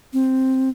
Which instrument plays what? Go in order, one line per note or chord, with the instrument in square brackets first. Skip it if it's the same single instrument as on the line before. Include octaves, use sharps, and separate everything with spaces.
[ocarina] C4